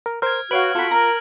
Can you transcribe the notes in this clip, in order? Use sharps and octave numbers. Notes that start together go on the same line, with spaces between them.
A#4
A#4 C5 F6 G#6
F#4 B4 C#5 F5 D7 F#7
F4 F#4 A4 B5
A#4 A#5